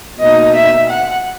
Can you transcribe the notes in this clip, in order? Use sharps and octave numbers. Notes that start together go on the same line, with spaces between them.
B2 A#3 D#4 D#5
E5
F#5